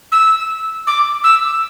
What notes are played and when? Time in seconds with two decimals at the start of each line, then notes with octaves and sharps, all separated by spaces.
0.12 E6
0.87 D6
1.24 E6